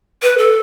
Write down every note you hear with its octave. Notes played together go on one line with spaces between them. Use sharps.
B4
A4